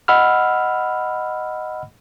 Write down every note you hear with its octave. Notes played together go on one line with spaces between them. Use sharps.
D#5 F#5 B5 E6 F6